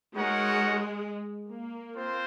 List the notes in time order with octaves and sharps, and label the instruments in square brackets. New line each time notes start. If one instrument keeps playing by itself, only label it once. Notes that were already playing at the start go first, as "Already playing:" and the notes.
[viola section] G#3 [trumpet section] D#4 F#4 A#4 C#5 F#5
[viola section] A#3
[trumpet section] C4 F4 C5